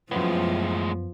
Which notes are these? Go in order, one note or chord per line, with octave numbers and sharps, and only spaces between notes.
F#2 A2 F3 G#3 B3